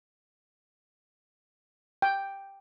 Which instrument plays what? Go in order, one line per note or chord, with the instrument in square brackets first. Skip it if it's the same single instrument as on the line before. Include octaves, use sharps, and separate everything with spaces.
[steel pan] G5